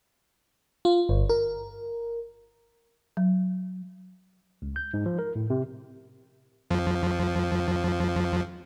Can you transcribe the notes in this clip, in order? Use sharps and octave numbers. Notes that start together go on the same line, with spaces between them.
F4
G1
A#4
F#3
C#2
G6
G#2
F3
A#4
A2
C3
F2 F3